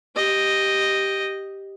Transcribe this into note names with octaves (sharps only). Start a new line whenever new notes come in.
G4 D#5